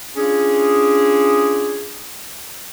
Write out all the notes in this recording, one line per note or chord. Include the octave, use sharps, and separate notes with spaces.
C#4 D4 F4 G#4